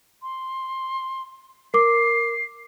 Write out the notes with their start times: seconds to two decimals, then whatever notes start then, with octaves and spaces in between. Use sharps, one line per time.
0.22 C6
1.74 A#4 D6 C7